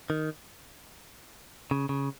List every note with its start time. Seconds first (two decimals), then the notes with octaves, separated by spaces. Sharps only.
0.10 D#3
1.71 C#3
1.89 C#3